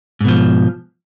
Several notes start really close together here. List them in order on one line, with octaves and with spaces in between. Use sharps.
G#2 B2 F3